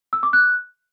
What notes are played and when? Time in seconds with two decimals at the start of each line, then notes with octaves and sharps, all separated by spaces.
0.13 E6
0.23 D6
0.33 F#6